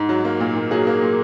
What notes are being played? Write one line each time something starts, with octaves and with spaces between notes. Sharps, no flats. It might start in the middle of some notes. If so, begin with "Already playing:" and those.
Already playing: G#2
F#3
A#3
A#2
A#2
F#3 G#4
A#3
A#2